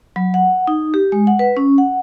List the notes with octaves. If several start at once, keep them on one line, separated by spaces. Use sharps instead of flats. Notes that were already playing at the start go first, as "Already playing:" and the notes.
F#3
F#5
D#4
G4
G#3
F#5
B4
C#4
F#5